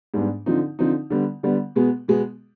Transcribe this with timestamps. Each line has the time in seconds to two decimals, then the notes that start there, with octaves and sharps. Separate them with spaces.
0.14 G#2 G3 B3 D4
0.46 D3 F3 C4 D#4
0.79 D3 F3 C4 D#4
1.10 D3 G3 B3
1.43 D3 G3 B3
1.76 B2 G#3 B3
2.08 B2 G#3 B3